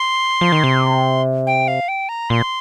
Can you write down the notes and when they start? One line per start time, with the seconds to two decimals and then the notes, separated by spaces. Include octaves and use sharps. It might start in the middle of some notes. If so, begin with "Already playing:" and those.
Already playing: C6
0.41 F3
0.52 D#3
0.64 C3
1.47 G5
1.68 F5
1.88 G5
2.09 A#5
2.30 A#2 C6